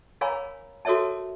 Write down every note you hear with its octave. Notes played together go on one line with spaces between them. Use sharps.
A#4 C#5 F5 G#5 A#5 B5
F#4 A4 A#4 C#5 E5 A5